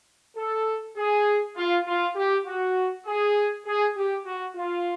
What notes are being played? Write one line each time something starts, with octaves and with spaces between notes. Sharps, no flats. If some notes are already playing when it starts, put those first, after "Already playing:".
A4
G#4
F4
F4
G4
F#4
G#4
G#4
G4
F#4
F4